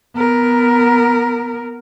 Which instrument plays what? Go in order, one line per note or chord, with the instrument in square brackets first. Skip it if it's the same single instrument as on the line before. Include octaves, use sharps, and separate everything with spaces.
[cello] B3 A#4